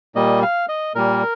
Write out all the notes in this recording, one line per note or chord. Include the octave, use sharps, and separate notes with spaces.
A#2 G3 A#3 D#5
F5
D#5
A#2 G3 A#3 A#4